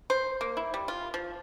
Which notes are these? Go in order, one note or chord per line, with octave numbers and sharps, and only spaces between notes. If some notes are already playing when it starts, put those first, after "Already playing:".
C5
A#3
E4
G3
F4
F3